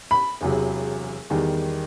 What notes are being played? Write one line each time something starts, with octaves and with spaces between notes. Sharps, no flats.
B5
E1 E2 C3 F#3
E2 D#3 G3